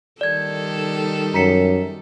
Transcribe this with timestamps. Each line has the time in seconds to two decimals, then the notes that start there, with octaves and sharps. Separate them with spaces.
0.21 D#3 G3 A4 D5 G#6
1.34 F#2 A#5 B6 C#7